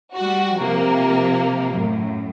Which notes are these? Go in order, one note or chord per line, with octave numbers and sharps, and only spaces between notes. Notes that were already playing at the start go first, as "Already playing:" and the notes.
G3 F#4
C3 F3 A#3
F#2 A2